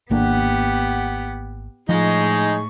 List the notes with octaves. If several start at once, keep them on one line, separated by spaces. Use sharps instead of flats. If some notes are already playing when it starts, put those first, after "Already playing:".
G#1 A#3 B3 D4 G4 F#5
A2 F3 G#3 D#4 G#4 C#6